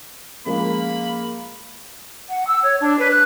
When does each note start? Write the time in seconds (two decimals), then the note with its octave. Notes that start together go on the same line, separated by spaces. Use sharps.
0.46 F3 G#3 A#3 C#4 B5
2.29 F#5
2.47 E6
2.63 C#5
2.80 D4
2.99 B4
3.11 F#6